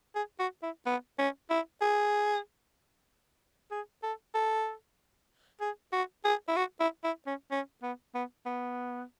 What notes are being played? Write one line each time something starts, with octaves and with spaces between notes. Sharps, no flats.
G#4
F#4
E4
B3
C#4
E4
G#4
G#4
A4
A4
G#4
F#4
G#4
E4
F#4
E4
E4
C#4
C#4
B3
B3
B3